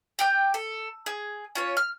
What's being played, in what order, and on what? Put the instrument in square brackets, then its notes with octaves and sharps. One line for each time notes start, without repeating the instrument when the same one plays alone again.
[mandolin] G4 G5 G6
A4
G#4
C#4 F4 C#5
F6